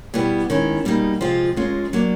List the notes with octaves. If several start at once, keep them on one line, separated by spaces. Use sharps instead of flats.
B2 G3 B3 E4 G4
D#3 G#3 C#4 E4
B2 G3 A#3 D#4
C3 F3 G#3 C4 F4
G#3 C#4 F4 A#4
F#3 A#3 D4